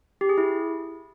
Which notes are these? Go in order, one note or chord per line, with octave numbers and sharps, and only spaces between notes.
G4
G#4
E4